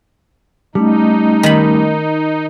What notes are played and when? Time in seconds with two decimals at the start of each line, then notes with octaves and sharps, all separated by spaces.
0.75 G3 A3 C#4 D#4
1.43 D#3 B5